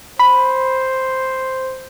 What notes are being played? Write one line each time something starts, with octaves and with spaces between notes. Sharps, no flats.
C5 B5